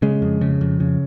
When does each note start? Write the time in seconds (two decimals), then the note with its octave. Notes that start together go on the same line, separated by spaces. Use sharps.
0.02 C#3 G#3
0.22 F2
0.41 C#3
0.61 F2
0.80 C#3